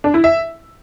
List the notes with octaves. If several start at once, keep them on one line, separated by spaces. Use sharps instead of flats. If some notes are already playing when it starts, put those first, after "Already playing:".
D4
E4
E5